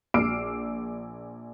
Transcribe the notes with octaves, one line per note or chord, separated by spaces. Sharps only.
A#1 D6 E6 F6 C7 D7